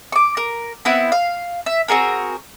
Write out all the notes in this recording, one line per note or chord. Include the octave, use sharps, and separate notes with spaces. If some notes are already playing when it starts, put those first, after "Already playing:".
C#6 D6
A#4
B3 C4 E4 F#5
F5
E5
C4 F#4 G#4 A#4